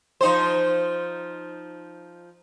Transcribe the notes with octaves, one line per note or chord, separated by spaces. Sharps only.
F3 D#4 C5